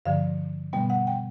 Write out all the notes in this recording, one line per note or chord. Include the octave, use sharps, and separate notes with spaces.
G2 D3 F3 F5
B2 G3 B3 G5
F#5
G5